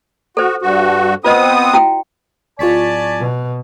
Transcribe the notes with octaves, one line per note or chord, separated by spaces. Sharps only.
F#4 A4 C5
G2 F#4
B3 C4 F4 C5 D#5 D#6
E4 F#4 G5
D1 F4 D5 G#5 A5 C#6 B6
B2